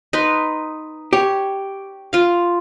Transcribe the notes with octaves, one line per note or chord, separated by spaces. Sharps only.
D#4 B4 C6
G4 C#5
F4 F5